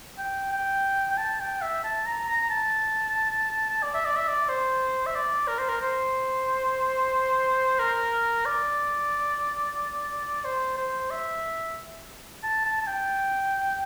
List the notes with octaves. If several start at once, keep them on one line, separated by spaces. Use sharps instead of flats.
G5
G5
G5
A5
G5
E5
A5
A#5
A#5
A#5
A5
D5
E5
D5
E5
D5
C5
E5
D5
A#4
C5
A#4
C5
A#4
D5
C5
C5
E5
A5
A5
A5
G5